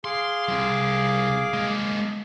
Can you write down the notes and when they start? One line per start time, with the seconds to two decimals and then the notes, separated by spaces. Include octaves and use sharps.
0.05 G#4 F5 C6 D6
0.48 C2 F#2
1.54 G#3 A#3